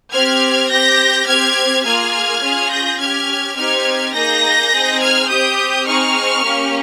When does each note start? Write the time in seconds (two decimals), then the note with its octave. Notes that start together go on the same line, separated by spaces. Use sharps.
0.12 C4 G4 F6 G#6
0.69 C4 G4 G6 A#6
1.27 C4 G4 F6 G#6
1.84 A#3 F4 G#4 F6 G#6
2.42 C#4 F4 G#4
2.70 G6 A#6
2.98 C#4 G4 F6 G#6
3.56 C4 D#4 G4 F6 G#6
4.13 A#3 D#4 G#4 G6 A#6
4.71 C4 D#4 G#4
5.00 F6 G#6
5.28 C4 G4 D#6 G6
5.85 C4 D#4 G#4 C#6 F6
6.43 A#3 C#4 G4